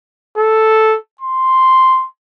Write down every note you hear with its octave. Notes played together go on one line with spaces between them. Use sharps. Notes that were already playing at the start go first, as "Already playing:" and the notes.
A4
C6